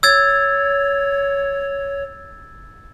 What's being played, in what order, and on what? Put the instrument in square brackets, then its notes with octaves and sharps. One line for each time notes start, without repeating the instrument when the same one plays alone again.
[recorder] C#5 [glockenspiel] E6 G#6 A6